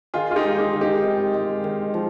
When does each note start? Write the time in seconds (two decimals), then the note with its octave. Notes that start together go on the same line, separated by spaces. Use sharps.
0.14 D#3 F4 G#4
0.31 F4
0.36 D#4 G4
0.44 G#3 G#4
0.59 D#4 G4
0.73 D#3
0.81 D#4 G4
1.04 C3
1.34 G#3
1.64 D#3
1.94 F3